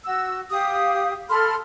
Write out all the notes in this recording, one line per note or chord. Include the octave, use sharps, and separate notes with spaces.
F#4 E6
G4 F5 D#6
A4 B5 C6 F6